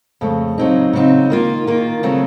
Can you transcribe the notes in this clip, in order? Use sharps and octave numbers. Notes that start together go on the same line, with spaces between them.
F2 C#3 A3
C#3 F#3 C4 D#4
C#3 F#3 C4 D#4
D#3 A#3 F4
D#3 A#3 F4
C#3 F#3 A3 C4